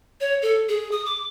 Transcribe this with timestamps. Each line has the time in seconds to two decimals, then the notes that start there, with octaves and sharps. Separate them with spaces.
0.20 C#5
0.42 A4
0.69 G#4
0.92 D#6
1.06 D6